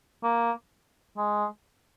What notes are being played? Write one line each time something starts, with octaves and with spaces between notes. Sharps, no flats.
A#3
G#3